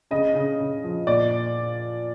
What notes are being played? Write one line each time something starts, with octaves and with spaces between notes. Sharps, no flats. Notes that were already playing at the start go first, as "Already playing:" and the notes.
C#3 D#5
C#3
C#3
F3
A#2 D5